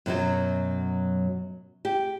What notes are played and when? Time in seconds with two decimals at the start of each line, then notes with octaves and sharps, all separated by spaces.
0.06 F#2 B2 E3 F#3
1.85 G4